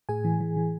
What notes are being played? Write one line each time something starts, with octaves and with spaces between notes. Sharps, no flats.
A2 G#4 G#5
E3
E3
E3